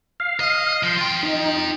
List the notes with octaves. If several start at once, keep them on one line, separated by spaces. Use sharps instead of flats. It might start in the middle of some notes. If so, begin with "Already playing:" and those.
F5
D#5
F3 C6
F4 G5
D#4